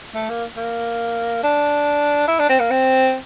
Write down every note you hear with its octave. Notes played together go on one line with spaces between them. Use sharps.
A3
A#3
A#3
D4
E4
D4
C4
A#3
C4